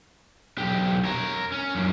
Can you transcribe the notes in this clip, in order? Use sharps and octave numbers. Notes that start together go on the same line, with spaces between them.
B1 G4
A#4 C#5
C#4
F#2 A#2